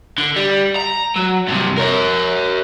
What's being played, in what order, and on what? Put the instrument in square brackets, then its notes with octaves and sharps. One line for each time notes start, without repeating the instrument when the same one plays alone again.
[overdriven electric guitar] D3
G3
A#5
F#3
G2 C3
A#4 C#5